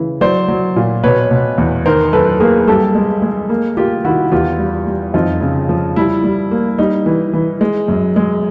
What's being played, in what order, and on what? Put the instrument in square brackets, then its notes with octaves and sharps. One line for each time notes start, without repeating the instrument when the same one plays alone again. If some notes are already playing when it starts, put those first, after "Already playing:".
Already playing: [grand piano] C#3 E3
F#3 C5 D5
F#3
A#2
B2 B4 C#5
B2
E2
D#3 A#4 C5
F#2 A4 B4
A#3 G#4 A#4
G2 G4 A4
G#3
G#3
A#3
A#3 F4 G4
D#3 E4 F#4
E2 F4 G4
G3
G3
F2 D#4 F4
C#3
F3
G3 E4
G3
A#3
G3 D#4
E3
E3
G#3
F#2
G#3